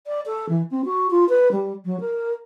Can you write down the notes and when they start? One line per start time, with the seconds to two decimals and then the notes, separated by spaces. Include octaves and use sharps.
0.07 D5
0.26 A4
0.49 E3
0.71 C4
0.85 F#4
1.10 F4
1.29 B4
1.51 G3
1.85 F#3
2.00 A#4